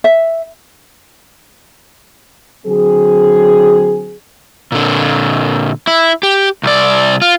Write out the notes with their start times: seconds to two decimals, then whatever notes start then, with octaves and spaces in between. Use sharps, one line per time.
0.04 E5
2.66 D3 F#3 C4 G#4
4.72 A#2 D3
5.87 E4
6.23 G4
6.63 C2 D5
7.22 F4